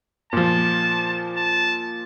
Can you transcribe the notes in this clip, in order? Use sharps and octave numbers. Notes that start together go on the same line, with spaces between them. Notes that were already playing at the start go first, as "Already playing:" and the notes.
A#2 F3 A5
A5